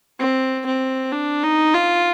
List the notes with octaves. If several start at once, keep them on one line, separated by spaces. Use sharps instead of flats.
C4
C4
D4
D#4
F4